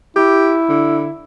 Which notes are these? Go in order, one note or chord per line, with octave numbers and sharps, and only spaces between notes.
E4 G4
D3